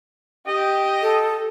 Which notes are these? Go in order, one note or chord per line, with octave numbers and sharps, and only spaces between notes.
G4 D#5 G5
A4